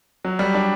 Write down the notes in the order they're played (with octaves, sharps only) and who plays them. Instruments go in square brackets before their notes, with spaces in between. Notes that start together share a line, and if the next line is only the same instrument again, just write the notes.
[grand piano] F#3
G3
D4